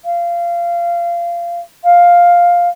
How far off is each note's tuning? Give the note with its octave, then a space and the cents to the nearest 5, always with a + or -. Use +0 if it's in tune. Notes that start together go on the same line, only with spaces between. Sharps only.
F5 -20
F5 +5